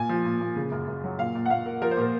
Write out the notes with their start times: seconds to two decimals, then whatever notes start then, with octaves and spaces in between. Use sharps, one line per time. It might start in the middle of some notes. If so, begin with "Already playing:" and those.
Already playing: A#2 G#5
0.09 F3
0.25 A#2
0.40 A#2
0.56 C#3
0.72 F#2
0.87 F#2
1.04 F#3
1.19 A#2 F5
1.35 A#2
1.46 F#5
1.50 A#2 F5
1.66 A#3
1.81 F3 A#4
1.91 C5
1.97 A#2 A#4